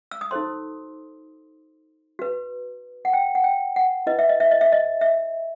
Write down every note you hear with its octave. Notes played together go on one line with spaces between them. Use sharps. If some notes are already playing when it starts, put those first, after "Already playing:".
E6
D#6
D#4 F#4 A4 C5 C6
F#4 B4
F#5
G5
F#5
G5
F#5
E4 B4 D#5
E5
D#5
E5
D#5
E5
D#5
E5